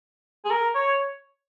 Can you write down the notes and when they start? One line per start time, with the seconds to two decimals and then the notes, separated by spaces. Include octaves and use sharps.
0.45 G#4
0.51 A#4
0.75 C#5